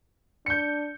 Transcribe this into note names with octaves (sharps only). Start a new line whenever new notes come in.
D4 G6 C#7